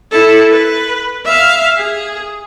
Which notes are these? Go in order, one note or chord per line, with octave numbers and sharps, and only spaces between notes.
E4 A4
B4
E5 F5
G#4